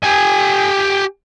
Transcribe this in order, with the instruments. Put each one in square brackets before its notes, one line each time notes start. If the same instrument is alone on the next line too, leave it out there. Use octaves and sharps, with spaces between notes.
[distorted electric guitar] G4 G#5